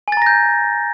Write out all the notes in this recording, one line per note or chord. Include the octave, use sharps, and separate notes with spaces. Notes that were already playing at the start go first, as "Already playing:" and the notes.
G#5 A#5 G6 A6 A#6